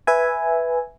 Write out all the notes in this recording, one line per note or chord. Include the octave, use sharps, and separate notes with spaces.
B4 E5 G#5